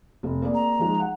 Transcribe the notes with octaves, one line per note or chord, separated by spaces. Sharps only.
F1
A#3 G#4 D5
A#5
F3 G#3 D#4
F#5